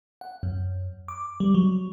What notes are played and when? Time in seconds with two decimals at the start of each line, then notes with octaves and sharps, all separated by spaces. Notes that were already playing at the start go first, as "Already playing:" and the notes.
0.21 F#5
0.43 F#2
1.08 D6
1.40 G3
1.54 F#3